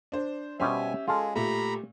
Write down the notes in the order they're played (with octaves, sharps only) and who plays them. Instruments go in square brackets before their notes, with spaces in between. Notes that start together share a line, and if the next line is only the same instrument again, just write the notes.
[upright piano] D4 C5
[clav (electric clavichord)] B2 G3 C5 [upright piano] C#4 G4 [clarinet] E5 [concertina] G#5
[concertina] G#3 G#4 [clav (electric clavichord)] F4 A5 [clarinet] A4
[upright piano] A#2 A3 [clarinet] G4 [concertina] A#5 B5